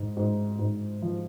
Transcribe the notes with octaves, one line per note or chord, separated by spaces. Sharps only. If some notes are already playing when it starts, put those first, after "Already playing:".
Already playing: G#2
G#2
G#2
F3